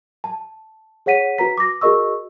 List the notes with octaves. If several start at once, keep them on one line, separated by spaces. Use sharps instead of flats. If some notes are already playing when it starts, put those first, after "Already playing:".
A5
G#4 C#5 F#5 B6 D#7
F#4 B4 A#5 B6
D6 A#6
F#4 G#4 A#4 D#5 C#6 E6